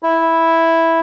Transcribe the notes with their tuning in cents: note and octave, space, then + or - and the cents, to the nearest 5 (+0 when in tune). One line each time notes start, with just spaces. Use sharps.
E4 -5